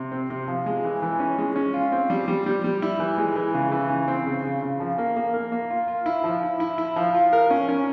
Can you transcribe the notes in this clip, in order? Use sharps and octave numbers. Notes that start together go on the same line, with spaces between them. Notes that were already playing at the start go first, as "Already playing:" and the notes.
Already playing: C3
C4
C3
F3
G#3
E3
E3
C#4
G#3
C#4
F4
C4
G3
G3
G3
G3
E4
E3
G#3
E3
C#3
E3
C#3
C4
C#3
C#3
C#3
F3
A#3
A#3
A#3
A#3
F4
F4
E4
F3
E4
E4
E4
F3
F4
A#4
C#4
C#4